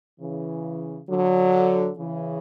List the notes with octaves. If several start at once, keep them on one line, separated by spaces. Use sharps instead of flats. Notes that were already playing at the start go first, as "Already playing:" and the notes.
C#3 E3
D3 F#3
C#3 E3